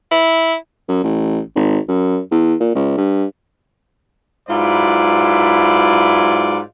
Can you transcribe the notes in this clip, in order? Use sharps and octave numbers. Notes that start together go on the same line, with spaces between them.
E4
F#2
A1
G#1
F#2
E2
A#2
C#2
G2
G#2 F#3 E4 F4 B4 D5